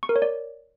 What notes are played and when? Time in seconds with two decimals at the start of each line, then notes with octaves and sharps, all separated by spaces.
0.03 C#6
0.09 A#4
0.16 C#5
0.22 D5